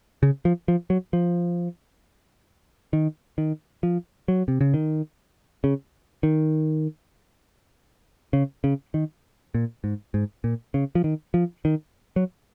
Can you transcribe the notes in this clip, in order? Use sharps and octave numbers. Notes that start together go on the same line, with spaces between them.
C#3
F3
F3
F#3
F3
D#3
D#3
F3
F#3
C3
C#3
D#3
C#3
D#3
C#3
C#3
D#3
A#2
G#2
G#2
A#2
C#3
F3
D#3
F3
D#3
F#3